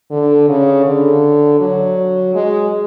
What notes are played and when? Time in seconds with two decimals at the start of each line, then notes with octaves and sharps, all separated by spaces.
0.11 D3
0.48 C#3
0.85 D3
1.60 F#3
2.35 G#3